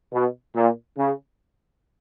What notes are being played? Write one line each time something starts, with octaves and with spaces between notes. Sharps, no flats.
B2
A#2
C#3